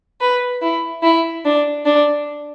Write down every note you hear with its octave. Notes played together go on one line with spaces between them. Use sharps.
B4
E4
E4
D4
D4